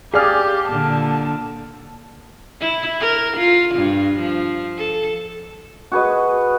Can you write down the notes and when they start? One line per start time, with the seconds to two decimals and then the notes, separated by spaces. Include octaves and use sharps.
0.14 G4 G#4 D5 F5 F6
0.68 A#2 D3 A5
2.61 E4
3.00 A#4
3.37 F4
3.75 G2
4.19 F3
4.78 A4
5.92 F#4 G#4 B4 D#5